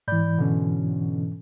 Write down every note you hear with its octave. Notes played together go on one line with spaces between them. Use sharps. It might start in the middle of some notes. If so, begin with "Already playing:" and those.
G#2 E3 D5 B5 G6
B2 D3 C#4